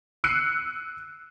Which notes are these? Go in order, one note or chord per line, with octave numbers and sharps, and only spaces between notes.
E6 F#6 C7 C#7 D#7